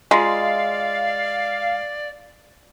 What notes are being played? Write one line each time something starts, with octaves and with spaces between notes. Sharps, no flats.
G#3 F4 F#4 D5 F5 C6